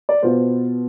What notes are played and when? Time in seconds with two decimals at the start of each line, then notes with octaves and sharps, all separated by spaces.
0.09 D5
0.23 B2 B3 F4 C5